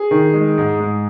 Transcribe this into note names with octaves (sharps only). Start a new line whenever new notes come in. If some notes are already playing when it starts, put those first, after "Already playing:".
Already playing: G#4
D#3
G#3
G#2
G#2